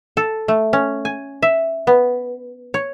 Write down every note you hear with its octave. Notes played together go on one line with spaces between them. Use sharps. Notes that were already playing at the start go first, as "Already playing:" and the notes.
A4
A3
C#4
G#5
E5
B3
C#5